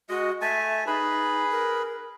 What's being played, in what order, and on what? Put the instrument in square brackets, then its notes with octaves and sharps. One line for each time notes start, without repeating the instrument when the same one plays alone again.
[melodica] G#3 D#5 [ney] F#4
[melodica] A3 G#5 A5 [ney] E5
[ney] D#4 [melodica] G#4 B4 B5
[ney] A#4